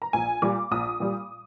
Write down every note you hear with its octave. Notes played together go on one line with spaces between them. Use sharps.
A#5
A#1 G#5
A#2 G3 D6
A#1 D#6
A#2 G3